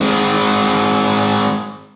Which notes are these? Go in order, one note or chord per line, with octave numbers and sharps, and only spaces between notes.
G#3 C4